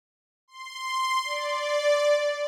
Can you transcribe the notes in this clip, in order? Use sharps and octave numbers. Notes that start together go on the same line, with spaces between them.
C6
D5